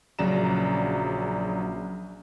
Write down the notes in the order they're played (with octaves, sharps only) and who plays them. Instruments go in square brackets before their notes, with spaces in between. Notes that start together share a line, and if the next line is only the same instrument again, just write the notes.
[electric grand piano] A#1 C#3 F#3 D5 A#5 E7